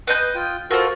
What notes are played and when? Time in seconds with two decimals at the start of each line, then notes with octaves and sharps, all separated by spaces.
0.07 B4 D#5 G6
0.35 F4 G5
0.71 F4 F#4 A4 A#4 C5